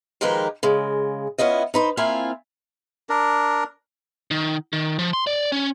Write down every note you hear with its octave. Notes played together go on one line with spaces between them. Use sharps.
D#3 F3 G#3 G4 A#4 B4
C#3 G#3
B3 C#4 E4 F4 D#5
D#4 B4 C5
A#3 C4 E4 F4 F5 G#5
D4 A#4
D#3
D#3
F3
C6
D5
C#4